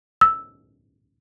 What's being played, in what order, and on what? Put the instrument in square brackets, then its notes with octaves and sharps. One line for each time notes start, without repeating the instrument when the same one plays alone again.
[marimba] E6